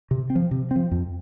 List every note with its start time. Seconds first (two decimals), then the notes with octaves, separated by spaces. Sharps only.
0.11 C3
0.30 C4
0.35 F3
0.51 C3
0.71 F3 C4
0.91 F2